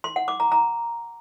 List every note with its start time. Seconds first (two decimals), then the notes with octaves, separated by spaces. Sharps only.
0.04 C6
0.16 F#5
0.28 D6
0.40 A#5
0.52 A#5